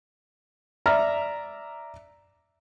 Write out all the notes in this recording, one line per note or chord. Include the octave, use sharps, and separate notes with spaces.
D5 E5 A#5 F6